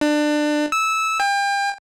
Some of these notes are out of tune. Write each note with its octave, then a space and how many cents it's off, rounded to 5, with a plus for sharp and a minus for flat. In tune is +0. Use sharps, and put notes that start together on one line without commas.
D4 +25
E6 -15
G5 +35